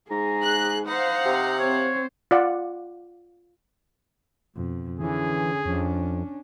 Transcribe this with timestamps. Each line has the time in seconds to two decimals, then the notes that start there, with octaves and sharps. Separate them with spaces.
0.11 G#2 G#4 A#5
0.43 F#6
0.87 D#4 C5 F5 F#5
1.26 C3
1.59 C4 C5 C#5
2.31 F4 D5 F#5
4.55 F2 B2
5.00 D3 E3 C#4 G#4
5.66 F2 C#4 D4